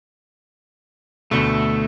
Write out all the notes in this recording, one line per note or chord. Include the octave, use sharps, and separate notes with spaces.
D2 B2 A3